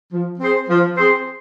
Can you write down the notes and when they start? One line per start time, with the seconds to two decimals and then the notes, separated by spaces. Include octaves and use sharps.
0.13 F3
0.40 C4 G#4 C5
0.69 F3
0.97 C4 G#4 C5